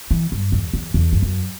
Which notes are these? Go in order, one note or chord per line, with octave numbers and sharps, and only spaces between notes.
E3
G2
E2
E2
E2
G2
F#2